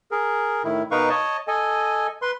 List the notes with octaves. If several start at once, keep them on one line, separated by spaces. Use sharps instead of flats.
G#4 A#4
A2 D#3 E4
B2 D#4 A#4 B4 F5 C#6
C#5 D#5 A5
A4 D#5 G#5
B4 C6